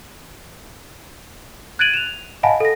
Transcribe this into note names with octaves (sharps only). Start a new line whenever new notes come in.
F#6 G#6 A6 D7 D#7 F#7
E7 F7
D#5 F5 F#5 G#5 A5 B5
A4 A#6